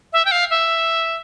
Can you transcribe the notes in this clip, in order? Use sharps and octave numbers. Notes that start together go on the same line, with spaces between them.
E5
G5
F5
E5